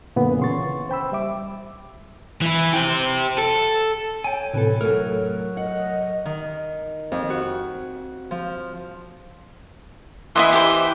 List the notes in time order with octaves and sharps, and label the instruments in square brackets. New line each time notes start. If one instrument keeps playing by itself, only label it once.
[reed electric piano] F#2 A#2 D3 B3
C#3 E3 C6 C#6 A6
C5 G5 B5 E6
G3 E5 D6
[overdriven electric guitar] E3 E4
G4 C5
A4
[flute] C#5 [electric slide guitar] G5 G#5
[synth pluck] A2 C3 [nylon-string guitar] E3 A4
[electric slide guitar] F#3 A#4 [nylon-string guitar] A3
[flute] D#5 [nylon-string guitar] F#5
[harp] D#3
F2
F#4
F3
[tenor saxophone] E3 [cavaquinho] E4 D#5 C6
[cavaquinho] G4 C5